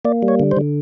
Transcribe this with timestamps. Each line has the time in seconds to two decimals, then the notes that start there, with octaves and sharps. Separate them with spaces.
0.05 A#3 D5
0.23 G3
0.28 C#5
0.40 D3
0.51 C5
0.57 D3